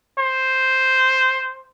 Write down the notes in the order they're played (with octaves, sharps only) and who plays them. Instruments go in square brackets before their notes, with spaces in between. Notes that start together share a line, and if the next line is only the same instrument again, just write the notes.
[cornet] C5